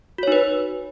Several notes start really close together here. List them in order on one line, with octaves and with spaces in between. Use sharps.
F#4 C#5 D#4 B4